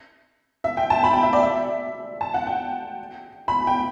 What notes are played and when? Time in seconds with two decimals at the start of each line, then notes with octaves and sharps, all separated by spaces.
0.64 E5
0.77 G5
0.90 A5
1.03 B5
1.13 G5
1.23 E5
1.33 D5
1.43 E5
2.21 A5
2.34 F#5
2.47 G5
3.48 B5
3.67 G5